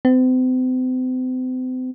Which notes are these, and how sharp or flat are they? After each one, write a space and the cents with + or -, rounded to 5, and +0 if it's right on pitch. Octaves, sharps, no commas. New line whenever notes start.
C4 -40